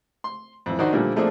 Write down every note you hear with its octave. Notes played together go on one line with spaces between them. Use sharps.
C6
F2 E3
D#3 D4 D#4 F#4 C5
A#2 D3 F3 G3 A3 A#3
F3 A3 A#3 C4 D4 G#4